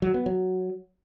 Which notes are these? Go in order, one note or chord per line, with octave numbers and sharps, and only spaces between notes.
F#3
B3
F#3